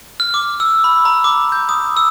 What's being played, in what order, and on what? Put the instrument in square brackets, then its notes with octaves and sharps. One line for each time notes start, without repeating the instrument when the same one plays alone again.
[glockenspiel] F6
D6
E6
B5
A#5
D6
G6
D#6
E6